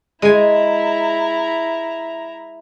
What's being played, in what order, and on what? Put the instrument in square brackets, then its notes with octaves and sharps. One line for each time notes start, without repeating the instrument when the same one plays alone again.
[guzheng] G#3 G#5 [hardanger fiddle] E4 A#5